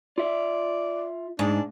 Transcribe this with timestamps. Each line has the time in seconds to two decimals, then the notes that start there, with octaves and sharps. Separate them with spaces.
0.18 F4 D5 E5
1.39 G#2 D4